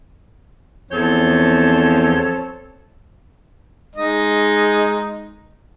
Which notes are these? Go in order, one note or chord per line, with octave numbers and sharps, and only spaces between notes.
E2 F3 C4 A4 C#5 G6
G#3 D#4 D#5